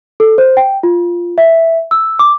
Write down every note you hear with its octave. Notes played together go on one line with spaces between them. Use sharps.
A4
C5
G5
F4
E5
E6
D6